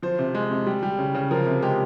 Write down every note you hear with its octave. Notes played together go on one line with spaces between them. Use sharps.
F3 C5
C3
G#3
C3
G3
G3
C#3
C#3
F3 A#4
C3
G#3 G4